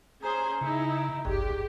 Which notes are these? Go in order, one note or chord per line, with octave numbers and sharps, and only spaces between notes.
C#4 G#4 C5 A#5
C#3 D#4 E4
G1 C2 F#2 G4 G#4